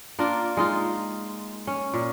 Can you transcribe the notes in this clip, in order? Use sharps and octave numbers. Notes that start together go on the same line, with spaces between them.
A#3 D4 F4 A#4
G#3 D#4 F4
C#4
A#2